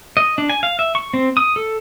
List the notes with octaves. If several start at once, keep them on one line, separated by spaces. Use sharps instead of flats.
D#5
D4
G#5
F5
E5
C#6
C4
D#6
A4